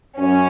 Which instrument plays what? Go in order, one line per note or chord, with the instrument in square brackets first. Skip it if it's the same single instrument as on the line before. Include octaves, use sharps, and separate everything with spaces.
[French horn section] F#2 [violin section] C#4